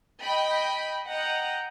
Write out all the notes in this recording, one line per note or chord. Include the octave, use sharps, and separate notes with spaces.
D#5 G5 B5
D#5 F#5 G5 A#5